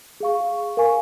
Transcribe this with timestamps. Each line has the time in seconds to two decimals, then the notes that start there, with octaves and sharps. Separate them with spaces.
0.20 G#4 F5 C#6
0.77 A#4 F5 G#5 C#6